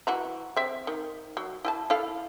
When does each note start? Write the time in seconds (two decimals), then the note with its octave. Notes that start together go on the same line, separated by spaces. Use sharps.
0.07 E3 F#4 A#5
0.56 C4 E5
0.87 D#3
1.37 F#3
1.65 E4 G#5 A5
1.90 E4 A4 F5